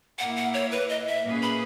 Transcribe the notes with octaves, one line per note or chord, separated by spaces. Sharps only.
A#2 A#3 E4 A#4 F#5
F#5
C#5
B4
D#5
E5
A#2 A#3 C#4 G#4 B4
B5